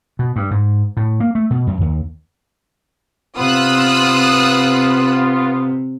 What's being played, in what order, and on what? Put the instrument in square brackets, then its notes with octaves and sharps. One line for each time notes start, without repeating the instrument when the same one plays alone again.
[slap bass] B2
G2
G#2
A2
A#3
A3
B2
F#2
D#2
[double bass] C3 [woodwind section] B3 F4 [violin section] D#6 E6 F#6